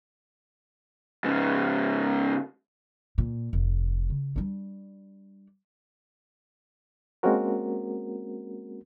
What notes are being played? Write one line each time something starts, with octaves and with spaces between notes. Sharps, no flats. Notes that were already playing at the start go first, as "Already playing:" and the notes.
G#2 C#3
A#2
F1
C#3
G3 D4
G#3 A#3 C4 C#4 F#4 A#4